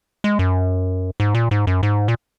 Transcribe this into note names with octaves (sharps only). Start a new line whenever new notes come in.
G#3
F#2
G#2
A#2
G#2
F#2
G#2
A#2